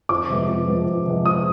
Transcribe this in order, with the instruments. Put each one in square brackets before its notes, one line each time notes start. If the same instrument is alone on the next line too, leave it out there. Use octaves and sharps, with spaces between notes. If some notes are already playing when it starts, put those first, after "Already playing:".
[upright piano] F2 D6
C3 F3 G#3 B3
F2
C3 F3 G#3 B3
F2
C3 F3 G#3 B3
F2 D#6